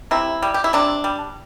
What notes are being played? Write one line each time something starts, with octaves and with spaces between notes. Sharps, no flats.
C3 E4
G3
G4
E4
C3 D4
G3